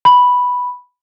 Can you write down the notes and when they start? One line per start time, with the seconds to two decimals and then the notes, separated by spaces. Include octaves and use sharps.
0.05 B5